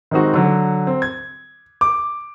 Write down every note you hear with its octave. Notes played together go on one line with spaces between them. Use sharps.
D#3 G#3 C4 D#4 F#4
D3 F#3
C4
G#6
D6